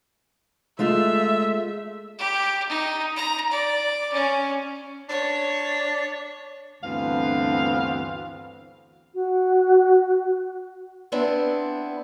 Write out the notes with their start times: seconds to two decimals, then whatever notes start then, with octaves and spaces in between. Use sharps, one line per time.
0.79 G#3 A3 F4 E5
2.19 G4
2.69 D#4
3.17 A#5
3.51 D5
4.13 C#4
5.09 D4 C#5
6.83 D2 G2 E3 B3 C4 F5
9.14 F#4
11.12 B3 C4 D4 E4